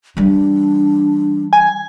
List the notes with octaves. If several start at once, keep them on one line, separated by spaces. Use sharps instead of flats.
E3 G3 D4
G#5